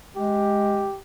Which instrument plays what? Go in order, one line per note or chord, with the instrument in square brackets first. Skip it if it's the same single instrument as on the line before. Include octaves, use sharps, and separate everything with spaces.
[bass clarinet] G#3 [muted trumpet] G4